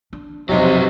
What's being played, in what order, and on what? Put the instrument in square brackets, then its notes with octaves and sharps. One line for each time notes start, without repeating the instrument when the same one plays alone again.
[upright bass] D4
[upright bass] E1 F2 [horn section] C3 [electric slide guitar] F#3 D#4